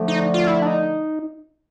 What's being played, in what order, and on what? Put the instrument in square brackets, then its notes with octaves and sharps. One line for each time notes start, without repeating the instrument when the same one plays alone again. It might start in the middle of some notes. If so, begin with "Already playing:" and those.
Already playing: [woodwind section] D3 F3 A3
[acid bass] D#4
F4
E4
D4
D#4